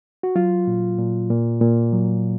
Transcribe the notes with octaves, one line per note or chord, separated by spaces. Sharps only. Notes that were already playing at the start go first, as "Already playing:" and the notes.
F#4
F#3 F4
A#2
A#2
A#2
A#2
F#3